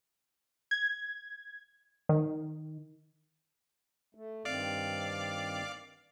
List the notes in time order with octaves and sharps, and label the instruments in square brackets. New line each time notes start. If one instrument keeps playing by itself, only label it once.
[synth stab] G#6
D#3
[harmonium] A3
[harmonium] G2 D#3 C4 [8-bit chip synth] D5 F5 D6